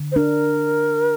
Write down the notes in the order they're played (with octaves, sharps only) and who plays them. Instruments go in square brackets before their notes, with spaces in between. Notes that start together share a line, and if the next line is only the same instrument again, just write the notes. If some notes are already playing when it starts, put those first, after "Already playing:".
Already playing: [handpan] D3
[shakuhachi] C5
[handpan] D4 [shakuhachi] A#4